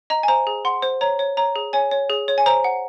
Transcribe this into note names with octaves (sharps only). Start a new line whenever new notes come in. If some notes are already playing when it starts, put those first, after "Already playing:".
D#5 A#5
G#5
C5 A#5
G#4
F#5 C6
C5
C#5 A#5
C#5
C#5 A#5
G#4
C#5 G#5
C#5
G#4
C#5
G#5
C5 A#5
F#5